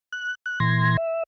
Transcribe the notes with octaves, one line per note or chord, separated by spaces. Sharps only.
F#6
F#6
A#2 E3 C6 G#6 A#6
E5